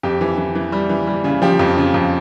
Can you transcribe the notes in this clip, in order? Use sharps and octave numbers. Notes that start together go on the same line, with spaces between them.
F2 G4
E3
E3
E3
G3
E3
G3
C#3
F3 G4
F2
C#3
F2